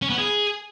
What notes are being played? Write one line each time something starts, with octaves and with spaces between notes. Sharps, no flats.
C#4
B3
G#4